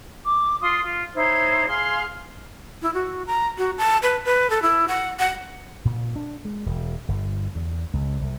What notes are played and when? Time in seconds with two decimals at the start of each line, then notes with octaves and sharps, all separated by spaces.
0.23 D6
0.61 F4 C6 D#6
0.83 F4
1.14 D#4 E4 C5 C#5
1.67 G#4 F5 C6 F6
2.82 E4
2.94 F#4
3.27 A#5
3.58 F#4
3.78 A5
4.02 B4
4.25 B4
4.50 A4
4.62 E4
4.88 F#5
5.19 F#5
5.85 A#2
6.16 D4
6.45 G#3
6.66 E1
7.08 G1
7.55 E2
7.94 C#2
8.21 C2